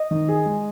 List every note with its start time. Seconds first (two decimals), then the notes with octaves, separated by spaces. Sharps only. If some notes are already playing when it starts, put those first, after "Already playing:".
Already playing: D#5
0.11 D#3
0.29 G#4
0.46 G#3